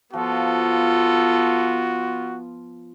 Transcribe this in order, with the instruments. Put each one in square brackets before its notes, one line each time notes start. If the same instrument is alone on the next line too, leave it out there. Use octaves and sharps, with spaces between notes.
[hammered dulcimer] F3 [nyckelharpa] B3 F4 [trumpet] F#4 [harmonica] A4